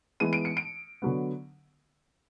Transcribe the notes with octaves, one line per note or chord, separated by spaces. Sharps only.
E3 G#3 B3 D#7
D7
C#7
D7
D3 F#3 B3